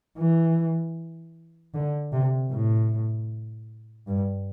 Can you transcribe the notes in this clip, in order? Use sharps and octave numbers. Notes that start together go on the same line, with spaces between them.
E3
D3
C3
A2
G2